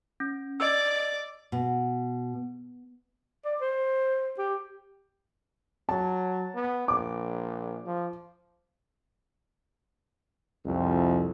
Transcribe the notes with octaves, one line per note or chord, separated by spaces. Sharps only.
C#4
D5 D#5 E6
B2
D5
C5
G4
F#3 A5
B3
A#1 D6
F3
C2 F2